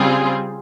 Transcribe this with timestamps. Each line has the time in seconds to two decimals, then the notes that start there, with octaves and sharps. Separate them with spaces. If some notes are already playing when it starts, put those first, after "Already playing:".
Already playing: C#3 G3 C4 F4 G#4